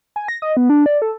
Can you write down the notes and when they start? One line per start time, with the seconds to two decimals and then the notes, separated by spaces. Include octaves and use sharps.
0.16 G#5
0.28 A#6
0.42 D#5
0.57 B3
0.69 D4
0.86 D5
1.02 A4